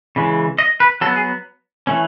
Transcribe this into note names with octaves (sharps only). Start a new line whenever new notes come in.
C#3 E3 G#3
D#5
B4
F#3 B3 A4
G#4
E3 A3 C#4